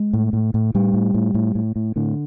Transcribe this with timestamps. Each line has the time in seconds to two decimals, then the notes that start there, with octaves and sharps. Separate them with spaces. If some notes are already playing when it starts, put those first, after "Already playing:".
Already playing: G#3
0.13 A2
0.33 A2
0.54 A2
0.74 A2 G3
0.94 A2
1.14 A2
1.34 A2
1.55 A2
1.76 A2
1.96 A2 D3